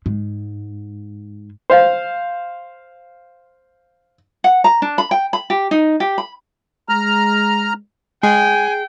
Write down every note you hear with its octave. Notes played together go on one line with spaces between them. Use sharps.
G#2
C5 F5
F#5
A#5
D4
B5
G5
B5
G4
D#4
G4
B5
G#3 A#5 F6
G#3 G#4 G5 G#5